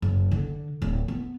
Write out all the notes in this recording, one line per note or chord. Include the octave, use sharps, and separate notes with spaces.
F#1
D3
D1
B3